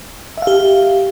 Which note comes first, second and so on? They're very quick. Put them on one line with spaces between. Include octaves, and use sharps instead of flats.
E5 F5 G4